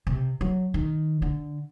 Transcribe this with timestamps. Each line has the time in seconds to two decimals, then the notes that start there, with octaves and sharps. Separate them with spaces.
0.07 C3
0.41 F#3
0.74 D#3
1.22 D3